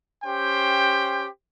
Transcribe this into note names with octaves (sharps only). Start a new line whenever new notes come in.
C#4 G4 C5 G5